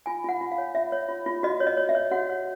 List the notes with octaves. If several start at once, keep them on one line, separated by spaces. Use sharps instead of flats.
F4 G#5
F4 F#5
F4
F5
C#5
F4 E5
C#5
F4
F4
F#4 D#5
C#5
D#5
C#5
E5
C#5
F#4 F#5
C#5